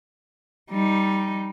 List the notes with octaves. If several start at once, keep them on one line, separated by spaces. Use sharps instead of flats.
G3 D#4